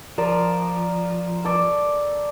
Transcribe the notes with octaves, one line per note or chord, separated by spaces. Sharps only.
F3 A#4 D5
A4 D5 C#6